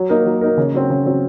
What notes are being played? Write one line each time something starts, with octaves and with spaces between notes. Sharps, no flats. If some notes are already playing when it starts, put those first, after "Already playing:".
Already playing: F#3
A#3 D#4 A#4
F#3
A#3 D#4 A#4
C#3
F#3 C4
C#3
F#3 C4